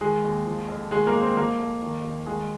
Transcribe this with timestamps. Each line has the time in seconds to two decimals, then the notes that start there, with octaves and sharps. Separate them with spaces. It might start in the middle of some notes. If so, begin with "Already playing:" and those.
0.01 D#3 G#3 G#4
0.24 D#2
0.46 F3
0.68 F2
0.91 D#3 G#3 G#4
1.07 A#3 A#4
1.14 G#2
1.21 C4 C5
1.36 F3 A#3 A#4
1.59 F2
1.82 D#3
2.04 D#2
2.26 D#3 G#3 G#4